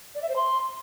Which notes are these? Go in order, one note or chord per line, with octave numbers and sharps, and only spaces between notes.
D5
E5
C5
C6